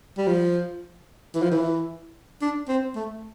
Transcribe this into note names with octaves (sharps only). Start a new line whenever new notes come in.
G3
F3
E3
F3
E3
D4
C4
A3